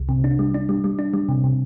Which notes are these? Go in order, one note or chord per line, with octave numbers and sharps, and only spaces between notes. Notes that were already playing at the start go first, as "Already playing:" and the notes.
Already playing: C2
C3
D4
G3
D4
G3
G3
D4
G3
C3
C3